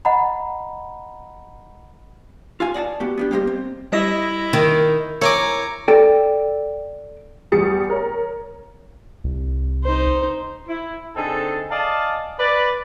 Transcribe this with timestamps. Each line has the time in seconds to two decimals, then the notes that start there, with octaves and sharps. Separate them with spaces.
0.05 D#5 F#5 A#5 B5
2.60 F4 F5 G#5
2.74 D5 D#5 F#5 A5
3.00 B3 F#4 G4
3.18 B3 D4 G4
3.31 G3 A#3 G4 A4 C5 D#5
3.47 C4
3.92 G3 E4 D#5 A#6
4.53 D#3
5.22 E4 A#4 C#5 G#5 A#5 D6
5.88 A4 D5 G5
7.52 E2 G3 G4 D#6 A6 C#7
7.90 A#4 C#5
9.24 C2
9.84 D#4 C5
10.68 E4
11.16 D3 C4 D#4 G#4 A4
11.71 D5 D#5 F5 G#5 A5
12.39 B4 D5